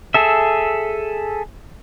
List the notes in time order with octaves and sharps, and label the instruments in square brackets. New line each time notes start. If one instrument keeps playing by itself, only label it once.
[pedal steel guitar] G#4 A4 E5